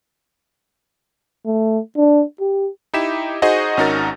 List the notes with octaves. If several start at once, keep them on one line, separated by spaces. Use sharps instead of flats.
A3
D4
G4
D#4 E4 G4 B6 E7
D#4 F#4 G#4 C5 D#5 F#5
G#1 C#4 D#4 F#4 A#4 A6